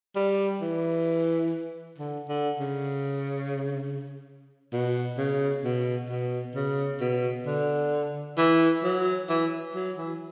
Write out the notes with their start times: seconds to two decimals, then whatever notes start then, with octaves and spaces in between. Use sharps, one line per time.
0.16 G3
0.61 E3
1.98 D3
2.29 D3
2.59 C#3
4.73 B2
5.18 C#3
5.64 B2
6.09 B2
6.55 C#3
7.01 B2
7.46 D3
8.38 E3
8.83 F#3
9.29 E3
9.75 F#3
9.97 E3